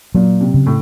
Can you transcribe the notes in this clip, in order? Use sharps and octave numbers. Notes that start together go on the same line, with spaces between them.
A#2 F#3
C3
C#3
A2